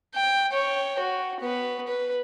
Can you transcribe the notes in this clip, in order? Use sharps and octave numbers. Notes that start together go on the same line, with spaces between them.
G5
C#5 G5
F#4
B3 B4
B4